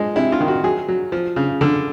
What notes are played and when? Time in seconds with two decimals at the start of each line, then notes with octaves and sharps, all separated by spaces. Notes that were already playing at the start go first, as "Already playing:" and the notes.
Already playing: F3 G#3
0.16 C3 E4
0.32 F4
0.41 D#3
0.48 F#4
0.64 F#3 G#4
0.88 F#3
1.12 F3
1.36 C#3
1.61 D3